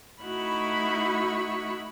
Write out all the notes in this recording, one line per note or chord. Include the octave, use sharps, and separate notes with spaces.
A3 D#4 E4 F#4 B5 C#6